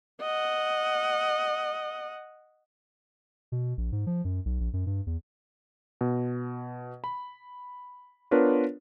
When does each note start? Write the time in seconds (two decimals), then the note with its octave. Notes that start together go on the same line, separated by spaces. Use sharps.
0.22 D#5 F#5
3.52 B2
3.77 A#1
3.92 G#2
4.07 F3
4.24 F#2
4.45 B1
4.60 A#1
4.73 F#2
4.86 G2
5.07 E2
6.01 B2
7.04 B5
8.31 B3 D4 F4 A#4 B4 C#5